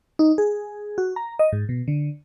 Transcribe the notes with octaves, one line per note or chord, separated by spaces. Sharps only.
D#4
G#4
F#4
A#5
D#5
G#2
B2
D3